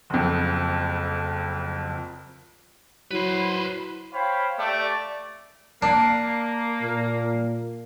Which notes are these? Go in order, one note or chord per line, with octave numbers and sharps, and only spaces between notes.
F#1 F2
F#3 E4 B4 C5
C5 C#5 F5 G5 B5
A3 G4 D5
A#3 D4
A#2